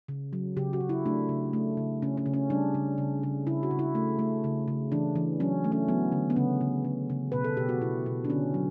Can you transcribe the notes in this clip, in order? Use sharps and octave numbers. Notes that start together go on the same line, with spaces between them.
C#3
F#3
C#3 G4
F#4
C#3
E4
A3 D4
C#3
A3
C#3
C#3 C#4
C#4
C#3
C#4
G3 D4
C#3
C#3
C#3
C#3 E4
F#4
C#3
E4
A3
A3
C#3
C#3
E3 D4
E3
F#3 C#4
A3
C#4
F#3 B3
D3
B3
C#3 C#4
C#3
C#3
C#3
B2 B4
A4
B2 G4
F#4
B2 E4
B2
D4
D3 C#4
F#3